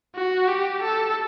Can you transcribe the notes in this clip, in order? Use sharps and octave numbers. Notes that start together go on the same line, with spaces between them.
F#4
G4
A4